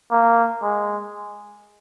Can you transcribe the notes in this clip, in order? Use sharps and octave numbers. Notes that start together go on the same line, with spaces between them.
A#3
G#3